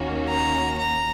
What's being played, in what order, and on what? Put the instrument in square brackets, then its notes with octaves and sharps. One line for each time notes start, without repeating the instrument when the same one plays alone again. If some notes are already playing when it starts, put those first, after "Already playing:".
Already playing: [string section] D#2 D#3 A#3 C#4 F#4
[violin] A#5
A#5